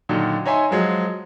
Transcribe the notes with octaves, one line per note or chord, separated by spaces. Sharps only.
A#2 D3 D#3 F#3
D#4 C#5 E5 G#5 C6
F3 F#3 G#3